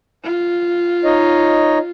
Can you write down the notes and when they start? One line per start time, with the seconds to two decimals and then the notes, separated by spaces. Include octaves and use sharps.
0.24 F4
1.05 D#4 C#5 D#5